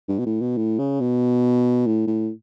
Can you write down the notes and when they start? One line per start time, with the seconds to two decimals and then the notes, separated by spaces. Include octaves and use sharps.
0.09 G2
0.19 B2
0.26 A2
0.41 B2
0.58 A2
0.79 C#3
1.01 B2
1.87 A2
2.07 A2